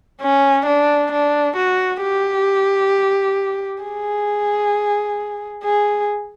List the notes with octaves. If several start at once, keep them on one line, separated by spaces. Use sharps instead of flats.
C#4
D4
D4
F#4
G4
G#4
G#4